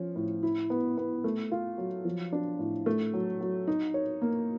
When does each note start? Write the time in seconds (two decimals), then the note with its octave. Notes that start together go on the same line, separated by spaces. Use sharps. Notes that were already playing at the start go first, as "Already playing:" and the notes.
Already playing: F3 C#4
0.16 A2
0.43 E4
0.70 B3
0.97 B3
1.24 A3
1.52 F4
1.78 F#3
2.05 F3
2.33 D4
2.59 A2
2.86 A3
3.14 F#3
3.41 F#3
3.68 D#4
3.94 C#5
4.21 A#3